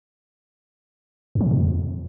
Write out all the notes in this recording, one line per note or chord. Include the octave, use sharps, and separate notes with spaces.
F2
F3
A2
B2
F2